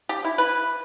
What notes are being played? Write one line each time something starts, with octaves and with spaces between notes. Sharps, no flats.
G4
E4
B4